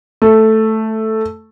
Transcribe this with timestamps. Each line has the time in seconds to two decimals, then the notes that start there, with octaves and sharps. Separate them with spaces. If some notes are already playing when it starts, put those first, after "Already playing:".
0.22 A3